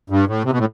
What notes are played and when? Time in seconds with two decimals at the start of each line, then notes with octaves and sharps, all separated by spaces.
0.10 G2
0.28 A2
0.44 C3
0.51 B2
0.58 A2